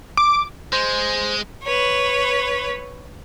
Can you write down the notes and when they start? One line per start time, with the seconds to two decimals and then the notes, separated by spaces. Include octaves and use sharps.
0.17 D6
0.73 G#3 C5
1.63 B4 C#5